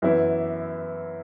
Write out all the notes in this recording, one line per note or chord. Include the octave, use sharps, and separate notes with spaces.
F#2 E3 B3 E4